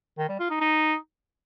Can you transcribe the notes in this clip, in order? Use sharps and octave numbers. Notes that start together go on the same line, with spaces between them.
D#3
G3
F4
D#4
D#4